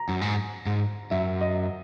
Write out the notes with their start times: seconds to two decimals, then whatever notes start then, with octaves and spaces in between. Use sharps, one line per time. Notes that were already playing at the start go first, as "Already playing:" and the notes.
Already playing: A#5
0.09 F#2
0.21 G#2
0.66 G#2
1.11 F#2 E5
1.41 D#5